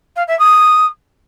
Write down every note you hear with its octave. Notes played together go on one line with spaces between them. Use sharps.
F5
E5
D#6